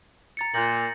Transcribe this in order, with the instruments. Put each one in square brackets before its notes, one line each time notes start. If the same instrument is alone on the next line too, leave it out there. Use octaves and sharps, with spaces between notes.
[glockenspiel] A#5 A6 C#7
[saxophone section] A#2 [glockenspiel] G6 A#6 F#7